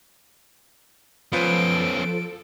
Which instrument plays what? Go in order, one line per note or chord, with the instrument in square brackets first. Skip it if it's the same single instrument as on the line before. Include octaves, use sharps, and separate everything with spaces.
[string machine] F3 A4 [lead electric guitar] B3 C#4 [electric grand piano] F4 B4 C5 [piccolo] D7